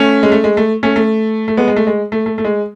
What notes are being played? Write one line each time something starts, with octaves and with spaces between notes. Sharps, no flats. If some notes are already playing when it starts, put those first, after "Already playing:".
Already playing: A3 C#4
G#3
A3
G#3
A3
A3 C#4
A3
A3
G#3 B3
G#3
A3
G#3
A3
A3
A3
G#3